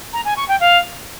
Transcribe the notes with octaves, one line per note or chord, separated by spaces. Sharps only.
A#5
G#5
C#6
G5
F5